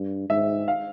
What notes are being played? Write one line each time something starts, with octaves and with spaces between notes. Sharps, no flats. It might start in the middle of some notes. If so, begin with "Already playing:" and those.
Already playing: G2
G#2 E5
F5